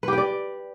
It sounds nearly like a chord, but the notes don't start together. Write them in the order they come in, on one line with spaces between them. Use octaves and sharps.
B4 G4 G5 D5